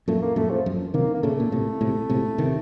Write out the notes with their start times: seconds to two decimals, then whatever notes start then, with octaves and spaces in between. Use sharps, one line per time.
0.08 F#2 A#2 A3
0.22 A#3
0.36 F#2 A#2 A3
0.51 F3
0.66 F#2
0.94 C3 D#3 A#3
1.14 A#3
1.23 A#2 C#3 A3
1.40 A#2
1.52 A2 C3
1.81 A2 C3
2.10 A2 C3
2.38 C3 D#3